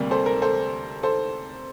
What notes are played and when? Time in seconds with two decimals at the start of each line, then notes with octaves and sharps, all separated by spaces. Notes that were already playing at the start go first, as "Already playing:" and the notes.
Already playing: D2 C3 G3 A#3
0.11 A4 C5
0.26 A#4
0.42 A4 C5
1.03 A4 C5